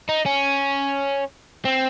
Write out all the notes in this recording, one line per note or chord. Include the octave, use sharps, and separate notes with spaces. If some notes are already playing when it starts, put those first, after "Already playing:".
D#4
C#4
C4